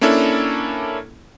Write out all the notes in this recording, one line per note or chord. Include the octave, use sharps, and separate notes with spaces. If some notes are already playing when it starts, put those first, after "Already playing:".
A#3 C#4 D4 E4 A4